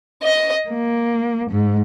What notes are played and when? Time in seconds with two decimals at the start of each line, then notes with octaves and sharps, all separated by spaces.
0.23 D#5
0.69 A#3
1.51 G#2